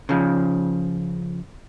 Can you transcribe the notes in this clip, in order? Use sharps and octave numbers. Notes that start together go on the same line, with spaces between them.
C#3 F3